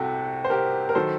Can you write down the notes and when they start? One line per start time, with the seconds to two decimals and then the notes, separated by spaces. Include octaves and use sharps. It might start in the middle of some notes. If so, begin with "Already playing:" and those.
Already playing: C2 C3 F#4 G4 A4
0.45 C5
0.50 G4 A#4
0.89 A#4
0.95 D#3 F#3 A4 C5